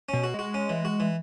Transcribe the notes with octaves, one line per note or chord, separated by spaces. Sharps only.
B2 C#4
F#4
G#3 F#4
C#4
E3
F#4
E3